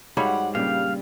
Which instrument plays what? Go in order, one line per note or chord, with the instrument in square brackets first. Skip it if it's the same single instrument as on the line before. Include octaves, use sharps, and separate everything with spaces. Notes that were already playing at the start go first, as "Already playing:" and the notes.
[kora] G#2 G3 C#5 [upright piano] F#4 F5 B5 [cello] F#5
[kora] G2 [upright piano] A#2 C#3 G4 [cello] G3 [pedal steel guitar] F5